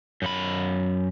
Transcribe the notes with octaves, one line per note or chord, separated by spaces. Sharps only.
F#2 B5